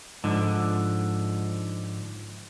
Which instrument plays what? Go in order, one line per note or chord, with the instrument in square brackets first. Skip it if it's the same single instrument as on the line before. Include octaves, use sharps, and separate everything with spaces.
[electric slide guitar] G#2 D3 F3